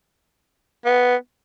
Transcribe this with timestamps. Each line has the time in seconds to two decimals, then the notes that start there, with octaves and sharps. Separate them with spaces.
0.85 B3